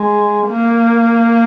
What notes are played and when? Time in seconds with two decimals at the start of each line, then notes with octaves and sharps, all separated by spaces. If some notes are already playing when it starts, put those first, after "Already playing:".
Already playing: G#3
0.48 A#3